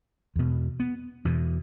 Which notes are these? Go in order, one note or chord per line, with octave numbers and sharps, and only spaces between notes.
E2 B2
B3
E2 B2 E3